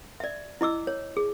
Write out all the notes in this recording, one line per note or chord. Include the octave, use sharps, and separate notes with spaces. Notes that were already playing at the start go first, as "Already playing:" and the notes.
D5 E5
E4 D#5 D6 E6
C#5
G#4